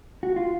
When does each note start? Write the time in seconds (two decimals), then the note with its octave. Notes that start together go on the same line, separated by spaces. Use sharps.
0.23 F#4
0.36 F4